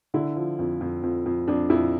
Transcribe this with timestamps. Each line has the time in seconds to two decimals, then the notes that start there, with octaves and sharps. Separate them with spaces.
0.14 D3 E4
0.36 F3
0.59 F2
0.81 F2
1.03 F2
1.26 F2
1.48 F2 D4
1.70 F2 E4